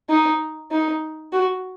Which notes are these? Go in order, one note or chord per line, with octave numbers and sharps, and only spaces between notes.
D#4
D#4
F#4